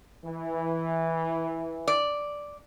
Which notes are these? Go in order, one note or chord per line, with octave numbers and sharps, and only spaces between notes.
E3
D5